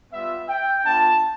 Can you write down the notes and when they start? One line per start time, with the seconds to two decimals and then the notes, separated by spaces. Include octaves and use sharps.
0.11 G3 B3 F4 E5
0.48 G5
0.84 B3 D4 F4 A5